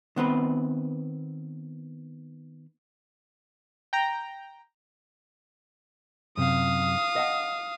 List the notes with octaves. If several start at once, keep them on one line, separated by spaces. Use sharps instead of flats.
D#3 B3 C4 B4
G5 A#5
F#2 C3 F5 D#6
D#5 F#5 A5